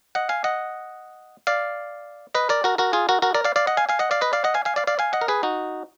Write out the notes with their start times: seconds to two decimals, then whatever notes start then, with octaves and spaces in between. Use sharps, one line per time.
0.15 D#5 F#5
0.29 F5 G#5
0.44 D#5 F#5
1.47 D5 F5
2.35 B4 D#5
2.49 A#4 D5
2.64 F#4 A#4
2.78 F#4 A#4
2.93 F4 G#4
3.09 F#4 A#4
3.22 F#4 A#4
3.34 A#4 D5
3.45 D5 F5
3.56 D5 F5
3.67 D#5 F#5
3.77 F5 G#5
3.89 F5 G#5
3.99 D#5 F#5
4.11 D5 F5
4.21 B4 D#5
4.33 D5 F5
4.44 D#5 F#5
4.54 F5 G#5
4.65 F5 G#5
4.76 D5 F5
4.87 D5 F5
4.99 F5 G#5
5.13 D#5 F#5
5.21 A#4
5.28 G#4 B4
5.43 D#4 F#4